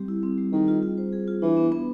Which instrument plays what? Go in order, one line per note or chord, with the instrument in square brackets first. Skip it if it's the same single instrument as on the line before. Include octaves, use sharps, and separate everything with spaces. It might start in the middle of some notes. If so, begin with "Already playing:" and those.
Already playing: [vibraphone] G3 C4 G4
E4
C4
G3
[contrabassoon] D#3 [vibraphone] G#4
[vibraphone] F4
F4
C5
G#4
F4
[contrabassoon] E3 [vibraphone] D4
[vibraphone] B3
B3